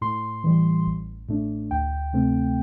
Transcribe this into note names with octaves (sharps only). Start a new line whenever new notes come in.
A2 C6
E3 G3
A1
A2 A3 D4
D2 G5
C3 A3 C4